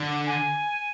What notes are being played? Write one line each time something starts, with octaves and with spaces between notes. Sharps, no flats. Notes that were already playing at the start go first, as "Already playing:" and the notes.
Already playing: D3
G#5